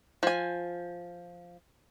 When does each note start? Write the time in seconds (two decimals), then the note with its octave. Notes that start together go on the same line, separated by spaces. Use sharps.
0.23 F3 G#5